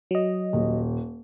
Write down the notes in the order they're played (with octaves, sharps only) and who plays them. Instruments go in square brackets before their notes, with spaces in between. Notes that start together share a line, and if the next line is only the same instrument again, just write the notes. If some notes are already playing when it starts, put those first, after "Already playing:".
[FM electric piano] F#3 D#5
[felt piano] D#1